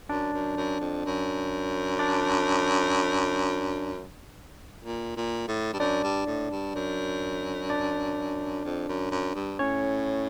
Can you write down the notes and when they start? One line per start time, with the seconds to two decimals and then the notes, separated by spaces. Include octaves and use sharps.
0.09 F#2 D4 D5
0.33 F#2
0.57 F#2
0.81 F2
1.05 F#2
1.99 D4 D5
4.84 A#2
5.16 A#2
5.48 A2
5.73 G2
5.79 F#2 D4 D5
6.03 G2
6.27 A2
6.51 G2
6.75 F#2
7.70 D4 D5
8.65 F2
8.88 F#2
9.11 F#2
9.35 G2
9.59 A2 C#4 C#5